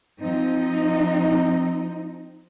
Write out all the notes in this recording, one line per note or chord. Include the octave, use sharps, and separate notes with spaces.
F3 C4 D#4